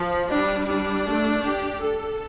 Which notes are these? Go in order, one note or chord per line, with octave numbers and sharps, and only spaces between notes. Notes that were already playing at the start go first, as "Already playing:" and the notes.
Already playing: F3
G3 D4
D4
A3
G4
A4